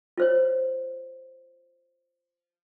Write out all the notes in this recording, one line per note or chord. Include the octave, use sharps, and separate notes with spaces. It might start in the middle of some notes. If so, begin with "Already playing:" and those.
F4 C5 C#5